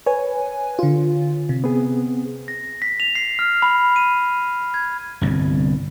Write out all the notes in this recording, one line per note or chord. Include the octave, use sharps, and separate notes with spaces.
B4 C#5 G#5
D3 F4
C3
B3 C4 G#4
A#6
B6
F7
C7
F6
B5
D#7
G#6
G1 C2 G2